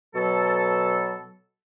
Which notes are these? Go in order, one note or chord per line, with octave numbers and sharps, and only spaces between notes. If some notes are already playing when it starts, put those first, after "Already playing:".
B2 F#3 A4